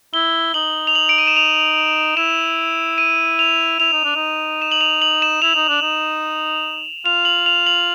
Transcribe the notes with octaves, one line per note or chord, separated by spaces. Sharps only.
E4 G7
D#4 F#7
F7
F#7
D7
D#7
E7
F7
E4 E7
D#7
F7
E4 F7
D#4
D4
D#4
E7
F#7
F7
F#7
E7
E4 F7
D#4
D4
D#4
F4 F7
F#7
F7
F#7